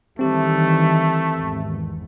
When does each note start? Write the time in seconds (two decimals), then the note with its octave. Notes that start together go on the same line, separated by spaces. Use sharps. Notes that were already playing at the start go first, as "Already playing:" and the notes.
0.19 D#3 E3 G3 A3 C4 G4
1.37 G#1 E2